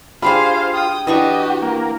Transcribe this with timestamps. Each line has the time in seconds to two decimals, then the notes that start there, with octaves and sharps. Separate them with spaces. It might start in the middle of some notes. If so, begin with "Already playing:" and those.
0.22 D4 F4 G4 G#4 C5 F5 B5
0.74 G5 D#6
1.07 E3 D4 F#4 G4 D#5 C#6
1.62 A#3